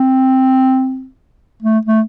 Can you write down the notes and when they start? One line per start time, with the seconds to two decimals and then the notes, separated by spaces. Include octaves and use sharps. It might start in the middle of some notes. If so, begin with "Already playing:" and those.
Already playing: C4
1.63 A3
1.85 A3